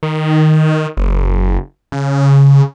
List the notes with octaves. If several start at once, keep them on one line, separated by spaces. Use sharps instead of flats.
D#3
F#1
C#3